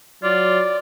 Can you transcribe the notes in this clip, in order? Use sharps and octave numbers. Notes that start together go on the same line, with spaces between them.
F#3 F4 D5